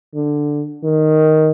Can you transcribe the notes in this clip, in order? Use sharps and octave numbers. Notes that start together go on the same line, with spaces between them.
D3
D#3